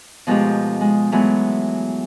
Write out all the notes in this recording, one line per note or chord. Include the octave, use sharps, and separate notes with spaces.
B2 F3 G#3 A3 D#4 G4
G#3
E3 F#3 G#3 A3 B3